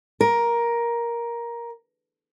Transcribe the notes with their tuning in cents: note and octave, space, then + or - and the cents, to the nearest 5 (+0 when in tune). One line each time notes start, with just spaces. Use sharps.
A#4 +10